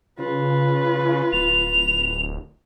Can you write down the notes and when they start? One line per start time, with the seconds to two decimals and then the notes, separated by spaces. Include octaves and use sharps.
0.19 C#3 F4 B4
1.33 D1 F7